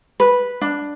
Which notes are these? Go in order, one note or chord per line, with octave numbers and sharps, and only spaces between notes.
B4
D4